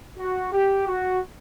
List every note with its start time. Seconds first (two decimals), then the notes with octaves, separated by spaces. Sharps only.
0.18 F#4
0.53 G4
0.87 F#4